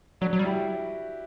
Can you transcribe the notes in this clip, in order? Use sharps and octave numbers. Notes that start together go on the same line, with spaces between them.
F#3 D4 F#4
F#3
G3
E4 G4